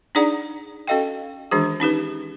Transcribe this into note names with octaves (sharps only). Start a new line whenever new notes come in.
D4 D#4 G#4 D5 F#5 A#5
C#4 F#4 A4 D#5 F5 G5
D#3 E3 G#3 D4 F#4 G#4
C#4 D#4 G4 B4